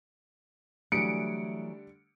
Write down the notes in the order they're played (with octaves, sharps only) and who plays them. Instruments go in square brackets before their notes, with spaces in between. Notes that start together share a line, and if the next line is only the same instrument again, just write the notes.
[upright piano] D3 G3 D4 [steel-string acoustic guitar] E3 F#3 [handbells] A3 [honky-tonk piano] C#7 D7